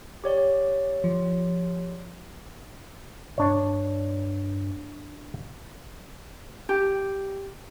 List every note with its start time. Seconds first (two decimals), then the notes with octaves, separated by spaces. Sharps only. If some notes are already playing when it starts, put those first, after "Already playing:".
0.24 G4 C#5 D5
1.04 F3
3.38 G2 D4 C#5
6.69 G4